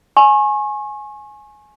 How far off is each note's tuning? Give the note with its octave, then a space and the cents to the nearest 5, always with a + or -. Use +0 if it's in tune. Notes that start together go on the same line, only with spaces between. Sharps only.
G#5 +15 C#6 -35